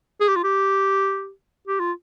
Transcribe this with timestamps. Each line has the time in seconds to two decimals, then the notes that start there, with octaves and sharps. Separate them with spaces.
0.20 G#4
0.28 G4
0.36 F4
0.44 G4
1.67 G4
1.80 F4